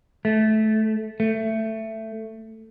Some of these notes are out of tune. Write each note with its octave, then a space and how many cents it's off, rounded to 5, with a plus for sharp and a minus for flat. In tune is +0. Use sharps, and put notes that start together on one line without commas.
A3 -15
A3 +10